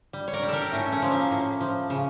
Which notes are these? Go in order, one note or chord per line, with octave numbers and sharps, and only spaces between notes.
G3
C#5
A#4 D5
G3
G4 A4 A#4
A2 A3 C#4
A3 C#4
F3
A#3
A2
F3
C#3